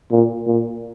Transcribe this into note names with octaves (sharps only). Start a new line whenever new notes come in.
A#2
A#2